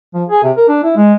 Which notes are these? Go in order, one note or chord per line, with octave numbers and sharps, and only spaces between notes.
F3
G#4
C3
A#4
D4
E4
G#3